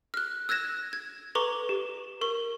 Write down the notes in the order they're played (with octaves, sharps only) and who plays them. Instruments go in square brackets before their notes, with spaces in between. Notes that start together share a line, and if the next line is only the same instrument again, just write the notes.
[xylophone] F6 F#6
E6 F#6 G#6 A#6 E7
G#6
A4 B4 A#5 C#6 D6
G4
A#4 C#6